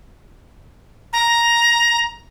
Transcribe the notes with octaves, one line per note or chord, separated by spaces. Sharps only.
A#5